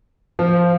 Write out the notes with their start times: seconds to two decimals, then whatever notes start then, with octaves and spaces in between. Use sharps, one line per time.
0.39 F3